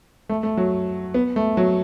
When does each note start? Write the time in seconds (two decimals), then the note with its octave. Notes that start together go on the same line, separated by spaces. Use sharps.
0.29 A3
0.43 A3
0.57 F#3
1.14 B3
1.36 A3
1.57 F#3